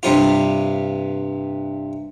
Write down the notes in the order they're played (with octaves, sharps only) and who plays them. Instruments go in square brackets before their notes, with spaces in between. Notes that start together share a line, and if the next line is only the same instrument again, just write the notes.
[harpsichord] G2 C3 F4